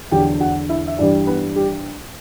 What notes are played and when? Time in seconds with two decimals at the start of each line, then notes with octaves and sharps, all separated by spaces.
0.11 E2 D3 F#3 G4 G5
0.40 F#4 F#5
0.69 E4 E5
0.87 E5
0.98 G2 E3 G3 D4 D5
1.27 B3 B4
1.55 G3 G4